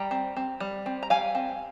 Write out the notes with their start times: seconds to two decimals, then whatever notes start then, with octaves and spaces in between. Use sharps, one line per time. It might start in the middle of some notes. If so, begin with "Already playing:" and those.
Already playing: G3 G5 A#5
0.11 C4
0.36 C4
0.60 G3
0.86 C4
1.03 A#5
1.10 G3 F5 G#5
1.35 C4